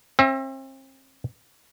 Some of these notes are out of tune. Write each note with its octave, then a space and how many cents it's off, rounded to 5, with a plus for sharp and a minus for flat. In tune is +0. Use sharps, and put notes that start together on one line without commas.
C4 +40 E5 +5